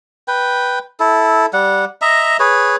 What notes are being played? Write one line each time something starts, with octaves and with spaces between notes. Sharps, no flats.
B4 G5
E4 A4
G3 F#5
D#5 E5 A#5
G#4 B4 C#5